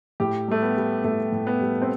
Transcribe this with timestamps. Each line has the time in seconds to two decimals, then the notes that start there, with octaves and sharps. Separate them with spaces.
0.20 A2 G4
0.48 G3 A3
0.62 B3
0.77 G3
1.04 A2 A3
1.32 A2
1.47 B3
1.61 G3
1.82 C4